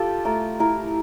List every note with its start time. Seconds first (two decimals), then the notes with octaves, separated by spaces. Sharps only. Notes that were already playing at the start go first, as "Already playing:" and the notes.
Already playing: F4 G4 A4
0.25 A3 A#4
0.60 E4 A#4